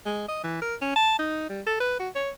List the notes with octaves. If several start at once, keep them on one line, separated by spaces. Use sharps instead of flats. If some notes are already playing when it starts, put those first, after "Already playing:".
G#3
D#5
E3
A#4
C#4
A5
D#4
G3
A4
B4
F#4
C#5